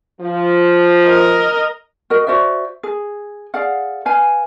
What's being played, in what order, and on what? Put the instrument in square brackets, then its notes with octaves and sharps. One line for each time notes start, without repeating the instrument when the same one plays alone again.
[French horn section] F3
[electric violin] A#4 D#5
[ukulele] F#4 A#4 D#5
F#4 C5 D5 E5
G#4
G#4 D5 F5 F#5
B4 F5 G#5